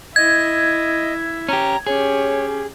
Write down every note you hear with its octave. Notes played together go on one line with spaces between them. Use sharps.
E4 D#5 E5 G#6
C#4 G4 A#5
C#4 G4 G#4 C#5